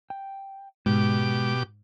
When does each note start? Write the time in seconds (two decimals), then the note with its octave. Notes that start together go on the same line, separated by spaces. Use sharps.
0.10 G5
0.86 G#2 B2 G#3 G4 D6